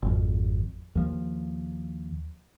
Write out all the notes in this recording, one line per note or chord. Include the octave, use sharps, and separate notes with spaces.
G#1 F2
D#2 F3